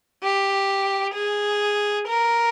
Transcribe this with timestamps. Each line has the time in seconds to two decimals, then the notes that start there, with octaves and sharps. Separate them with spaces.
0.23 G4
1.15 G#4
2.07 A#4